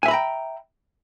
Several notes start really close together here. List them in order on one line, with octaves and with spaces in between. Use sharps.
G#5 E5 B5 A#5 G5